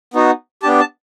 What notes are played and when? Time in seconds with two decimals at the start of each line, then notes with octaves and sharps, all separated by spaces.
0.14 B3 D#4 F#4
0.63 B3 D4 G4 A5
0.80 A5